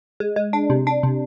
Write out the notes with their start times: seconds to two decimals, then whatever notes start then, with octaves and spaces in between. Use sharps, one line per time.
0.20 G#3
0.36 G#3
0.53 D4
0.70 C3
0.87 D4
1.03 C3